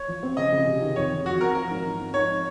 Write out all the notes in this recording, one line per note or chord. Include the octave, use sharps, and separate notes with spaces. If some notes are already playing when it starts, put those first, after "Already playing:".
Already playing: C#5
F3
C4
C#3 D#5
C#3
C3
D#3
F2 C#5
F2
F3 F#4
C4 A#4
F4 A#4
G#2
F3
C4
D#4 C#5